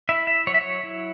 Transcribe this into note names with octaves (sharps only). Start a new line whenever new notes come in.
E4 E5
E5
F#3 C#5
E5
C#5
E4